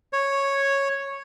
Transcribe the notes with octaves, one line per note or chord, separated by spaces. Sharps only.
C#5